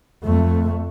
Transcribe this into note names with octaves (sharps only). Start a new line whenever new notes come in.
F2 A3